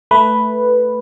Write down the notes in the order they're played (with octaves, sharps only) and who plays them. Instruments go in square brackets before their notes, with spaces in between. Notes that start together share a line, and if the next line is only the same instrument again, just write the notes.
[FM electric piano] A3 B4